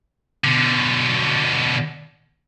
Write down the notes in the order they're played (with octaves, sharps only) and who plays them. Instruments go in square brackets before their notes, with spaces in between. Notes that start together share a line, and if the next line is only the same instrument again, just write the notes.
[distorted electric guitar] B2 D3